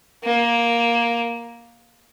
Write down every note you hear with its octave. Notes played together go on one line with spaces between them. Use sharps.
A#3